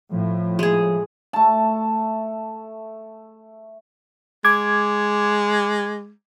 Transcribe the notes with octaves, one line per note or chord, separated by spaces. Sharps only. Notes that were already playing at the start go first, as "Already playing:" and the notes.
A2 F3
G#3 G#4
A3 A5
G#3 D6 G#6